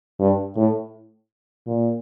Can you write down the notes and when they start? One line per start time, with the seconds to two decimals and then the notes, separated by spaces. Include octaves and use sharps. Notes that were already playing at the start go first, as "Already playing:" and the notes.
0.20 G2
0.56 A2
1.67 A#2